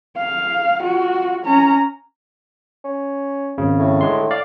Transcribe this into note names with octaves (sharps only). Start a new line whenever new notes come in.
F5
F4 F#4
C#4 A#5
C#4
G#1 C#3
A2
D3 G#3 C6
D5 F5